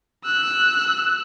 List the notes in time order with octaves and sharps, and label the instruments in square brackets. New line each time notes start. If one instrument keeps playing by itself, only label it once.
[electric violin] E6 F#6